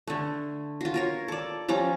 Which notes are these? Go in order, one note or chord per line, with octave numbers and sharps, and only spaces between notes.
D3 A3
F4 F#4
F4 A#4 C#5
A4 D5
F3 G3 C#4 A#5